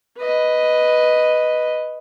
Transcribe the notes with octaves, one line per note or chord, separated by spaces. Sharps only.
B4 D#5